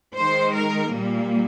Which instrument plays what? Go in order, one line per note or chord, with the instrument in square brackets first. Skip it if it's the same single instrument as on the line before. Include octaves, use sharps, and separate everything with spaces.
[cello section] D#3 G#3 C5
A#4
A#2 G3 A#3